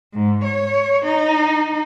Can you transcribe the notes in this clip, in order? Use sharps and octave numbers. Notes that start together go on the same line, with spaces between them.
G#2
C#5
D#4